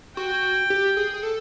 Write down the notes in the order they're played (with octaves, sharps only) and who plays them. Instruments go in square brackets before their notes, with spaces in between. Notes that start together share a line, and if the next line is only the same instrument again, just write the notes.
[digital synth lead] F#4 [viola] G5
[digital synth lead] G4
G#4
G#4
A4